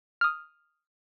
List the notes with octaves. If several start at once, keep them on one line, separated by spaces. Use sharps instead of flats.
D#6 F6